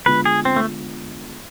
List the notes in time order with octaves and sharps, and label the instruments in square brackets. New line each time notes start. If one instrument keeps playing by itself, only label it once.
[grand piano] D3 G#3 B3 F4 [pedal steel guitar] B4
[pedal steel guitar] G#4
C4
A3